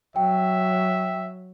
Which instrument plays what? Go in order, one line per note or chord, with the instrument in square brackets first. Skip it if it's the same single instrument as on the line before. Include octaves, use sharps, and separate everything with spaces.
[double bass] F#3 [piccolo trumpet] E5 [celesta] G5